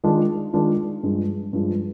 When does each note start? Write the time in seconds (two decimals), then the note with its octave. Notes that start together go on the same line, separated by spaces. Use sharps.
0.04 D#3 G#3 D4 F4
0.53 D#3 G#3 D4 F4
1.03 G2 F3 G#3
1.53 G2 F3 G#3